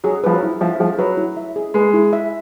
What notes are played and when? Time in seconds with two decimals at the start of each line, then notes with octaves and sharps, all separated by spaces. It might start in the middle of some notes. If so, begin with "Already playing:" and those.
0.04 F#3 G#4
0.24 F3 B4
0.33 F#3
0.43 E4
0.61 F3 E5
0.80 F3 G#4
0.99 F#3 B4
1.17 E4
1.37 E5
1.56 G#4
1.74 G#3 B4
1.94 E4
2.13 E5